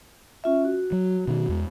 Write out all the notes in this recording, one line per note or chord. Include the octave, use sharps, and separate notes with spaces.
C#4 F4 E5
F#4
F#3
B2 D#3
E2 G#3